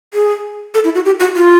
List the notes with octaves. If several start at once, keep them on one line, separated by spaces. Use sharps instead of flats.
G#4
A4
E4
F#4
G4
F#4
F4